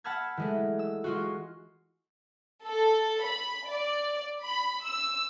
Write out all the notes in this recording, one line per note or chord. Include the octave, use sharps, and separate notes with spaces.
F#5 A5 B5 E6 F6 G#6
E3 G#3 A3
E6
G#3 F4 F#4
A4
B5
D5
B5
E6